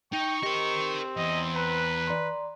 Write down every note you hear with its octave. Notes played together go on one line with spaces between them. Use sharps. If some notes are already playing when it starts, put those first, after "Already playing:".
D#4 G5 C#6
C4 G4 A#4 D#5
E2 E3 D#5
B4 A#5 F#6
D5 A#5 C6